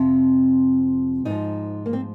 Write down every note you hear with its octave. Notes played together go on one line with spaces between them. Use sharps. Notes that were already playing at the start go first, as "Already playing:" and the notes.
Already playing: F2 C3 F3 C4
G#2 F3 D#4
A#3
C4